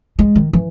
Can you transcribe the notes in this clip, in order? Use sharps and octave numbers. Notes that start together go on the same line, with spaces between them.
G#3
D#3
E3